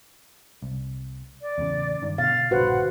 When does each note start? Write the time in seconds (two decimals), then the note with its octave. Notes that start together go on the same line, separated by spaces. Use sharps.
0.62 C2
1.42 D5
1.58 E2 A2 C#3
2.02 G2 D#3
2.18 B2 D3 F5 A6
2.51 A#1 G2 D3 F#4 B4 C5 F#5